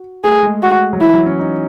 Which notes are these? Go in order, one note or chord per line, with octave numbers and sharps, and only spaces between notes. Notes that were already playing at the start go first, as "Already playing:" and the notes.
Already playing: F#4
A3 G#4
G#3
F#4
F#3
E3 E4
F#3
C#4
D#4